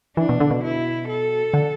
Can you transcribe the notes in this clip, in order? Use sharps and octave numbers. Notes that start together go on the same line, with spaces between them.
E3 D4
B2
D3
B2
E4
A4
D3